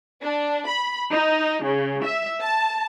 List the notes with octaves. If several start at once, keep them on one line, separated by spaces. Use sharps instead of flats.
D4
B5
D#4
C#3
E5
A5